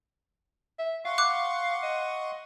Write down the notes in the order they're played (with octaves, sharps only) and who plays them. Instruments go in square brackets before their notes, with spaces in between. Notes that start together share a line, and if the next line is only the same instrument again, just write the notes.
[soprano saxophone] E5
[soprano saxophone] F5 [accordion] F#5 C6 C#6
[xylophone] D6 F#6
[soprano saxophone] D#5